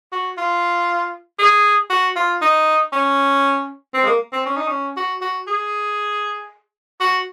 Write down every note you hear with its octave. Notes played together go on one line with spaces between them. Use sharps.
F#4
F4
G#4
F#4
F4
D#4
C#4
C4
G#3
A#3
C4
C#4
D#4
C#4
F#4
F#4
G#4
F#4